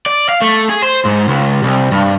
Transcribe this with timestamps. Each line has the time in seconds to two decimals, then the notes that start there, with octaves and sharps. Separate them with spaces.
0.06 D5
0.29 F5
0.42 A3
0.69 G#4
0.82 C5
1.05 G#2
1.28 C#2
1.63 C2
1.91 G2